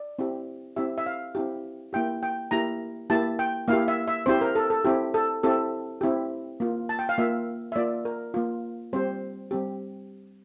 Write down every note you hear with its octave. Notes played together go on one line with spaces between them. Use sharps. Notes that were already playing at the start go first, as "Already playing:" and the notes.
Already playing: D5
C4 E4 G4
C4 E4 G4 E5
E5
F5
C4 E4 G4
A#3 E4 G4 G5
G5
A#3 E4 G4 A#5
A#3 E4 G4 A5
G5
A#3 E4 G4 F5
E5
E5
C4 E4 G4 C5
A#4
A4
A4
C4 E4 G4
A4
C4 E4 G4 A4
C4 E4 G4
A#3 F4
A5
G5
F5
A#3 F4 E5
E5
A#3 F4 D5
A#4
A#3 F4
G3 C4 G4 C5
G3 C4 G4